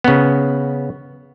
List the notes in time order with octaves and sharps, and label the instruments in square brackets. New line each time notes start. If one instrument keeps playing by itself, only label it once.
[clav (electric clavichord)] C#3 B3